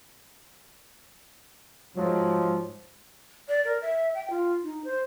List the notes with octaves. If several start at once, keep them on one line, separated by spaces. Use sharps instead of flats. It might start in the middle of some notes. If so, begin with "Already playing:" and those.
G#2 F3 F#3
D5
A#4
E5
G5
F4
D#4
C5